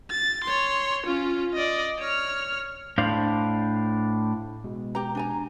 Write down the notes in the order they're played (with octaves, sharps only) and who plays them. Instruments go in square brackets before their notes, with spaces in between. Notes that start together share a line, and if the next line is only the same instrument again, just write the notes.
[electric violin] A6
C#5 C6
C#4 F4
D5 D#5
C#5 F6
[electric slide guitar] A2 D4 C5 F5
[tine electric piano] B2 G#3
[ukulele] G4 A#5
D4 G#5 A#5